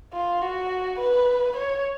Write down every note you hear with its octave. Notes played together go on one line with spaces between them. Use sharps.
F4
F#4
B4
C#5